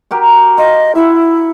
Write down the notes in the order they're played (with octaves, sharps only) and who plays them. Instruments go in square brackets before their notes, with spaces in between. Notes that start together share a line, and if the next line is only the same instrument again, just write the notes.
[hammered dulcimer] F#4 G4 A#4
[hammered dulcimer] F4 [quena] D#5
[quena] E4 [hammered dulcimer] E5 F#5